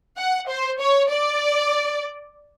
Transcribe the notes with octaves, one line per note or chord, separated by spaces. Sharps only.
F#5
C5
C#5
D5